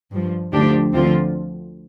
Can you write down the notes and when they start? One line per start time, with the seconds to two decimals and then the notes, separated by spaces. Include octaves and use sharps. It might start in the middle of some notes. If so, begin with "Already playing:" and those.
0.11 G2 F3
0.52 D2 D3 F3 D4 G4
0.93 D2 D3 F3 C4 F4